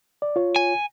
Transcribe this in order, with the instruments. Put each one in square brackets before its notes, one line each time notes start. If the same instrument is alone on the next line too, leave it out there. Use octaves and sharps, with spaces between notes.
[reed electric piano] D5
F4 C#5
[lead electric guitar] G#5